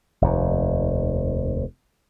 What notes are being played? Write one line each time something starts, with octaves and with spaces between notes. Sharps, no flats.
F1 D#2